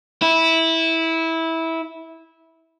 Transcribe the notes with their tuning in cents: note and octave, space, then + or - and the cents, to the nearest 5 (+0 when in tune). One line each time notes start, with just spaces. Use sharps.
E4 -15